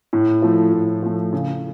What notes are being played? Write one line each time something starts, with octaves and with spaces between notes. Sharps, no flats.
A2
F3 A3
A2
F3 A3
C#3